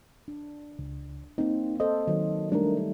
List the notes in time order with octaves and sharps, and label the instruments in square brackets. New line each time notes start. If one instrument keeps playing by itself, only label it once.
[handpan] D4
[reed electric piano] C#2
[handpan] A#3 C4 [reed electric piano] D#4
[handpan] A4 C5 [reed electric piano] D#5
[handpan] D#3 F#3
[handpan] G3 A3 D#4 [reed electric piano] D4 A#4